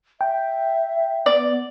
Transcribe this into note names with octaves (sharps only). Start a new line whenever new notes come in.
E5 G5
B3 D5